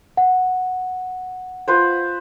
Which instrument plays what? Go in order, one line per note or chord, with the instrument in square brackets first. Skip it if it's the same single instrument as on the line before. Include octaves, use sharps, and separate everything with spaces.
[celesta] F#5
[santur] F4 B4 C5